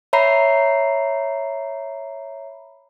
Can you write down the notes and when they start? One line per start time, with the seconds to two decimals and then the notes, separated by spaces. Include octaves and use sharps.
0.13 C#5 E5 A#5 B5 C7